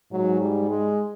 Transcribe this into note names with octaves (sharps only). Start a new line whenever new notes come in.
G#2 F#3
G3
G#3